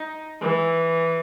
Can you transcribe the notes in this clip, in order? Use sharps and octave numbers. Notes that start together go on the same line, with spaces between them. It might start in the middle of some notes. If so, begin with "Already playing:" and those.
Already playing: D#4
E3